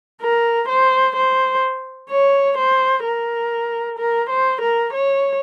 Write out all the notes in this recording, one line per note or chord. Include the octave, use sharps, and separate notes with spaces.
A#4
C5
C5
C#5
C5
A#4
A#4
C5
A#4
C#5